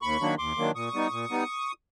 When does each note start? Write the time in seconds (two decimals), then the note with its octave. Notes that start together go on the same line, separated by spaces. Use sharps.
0.02 D#2 B5 C#6
0.20 D#3 F#3 A#3 D4
0.38 D#2 C6 D6
0.57 D#3 F#3 A#3 D4
0.75 A#2 C#6 D#6
0.93 G3 B3 D#4
1.11 A#2
1.30 G3 B3 D#4